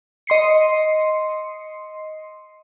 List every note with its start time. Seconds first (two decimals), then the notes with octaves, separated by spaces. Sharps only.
0.27 D#5 C6 C7 C#7